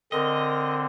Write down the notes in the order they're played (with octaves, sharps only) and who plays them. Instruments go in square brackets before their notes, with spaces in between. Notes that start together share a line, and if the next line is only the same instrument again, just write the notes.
[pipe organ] D3 C4 [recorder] A#4 [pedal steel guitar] D#5